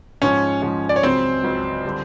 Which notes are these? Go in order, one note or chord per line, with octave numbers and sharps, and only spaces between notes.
G#2 F3 G#3 C#4 C#5
G#2 F3 G#3 C#4
D5
C#5
C#2 C#3 F#3 C4 C5
C#2 C#3 F#3
D3 G3